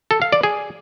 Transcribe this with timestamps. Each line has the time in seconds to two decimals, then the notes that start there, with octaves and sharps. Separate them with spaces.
0.11 A4
0.22 F5
0.32 D5
0.43 G#4